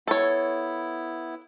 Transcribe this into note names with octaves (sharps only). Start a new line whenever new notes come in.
B3 E4 A4 C#5